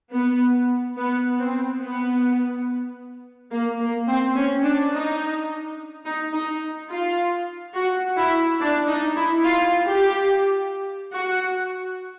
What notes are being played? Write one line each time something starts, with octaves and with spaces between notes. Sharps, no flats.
B3
B3
C4
B3
A#3
A#3
C4
C#4
D4
D#4
D#4
D#4
F4
F#4
E4
D4
D#4
E4
F4
G4
F#4